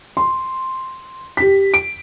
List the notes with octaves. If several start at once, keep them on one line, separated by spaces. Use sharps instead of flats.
C6
G4 B6
D7